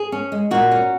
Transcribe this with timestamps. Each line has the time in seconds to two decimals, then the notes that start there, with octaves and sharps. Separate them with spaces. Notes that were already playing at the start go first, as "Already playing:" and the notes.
Already playing: G#4
0.12 C#4
0.32 G#3
0.51 A#2 F#4
0.71 C#4